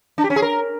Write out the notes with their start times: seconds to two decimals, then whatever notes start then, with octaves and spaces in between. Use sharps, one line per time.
0.18 D4
0.24 G4
0.30 C#4
0.36 G#4
0.42 A#4